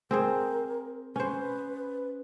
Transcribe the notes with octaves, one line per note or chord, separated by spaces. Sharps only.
C4 G#4 A#4 C5
C#4 B4 C5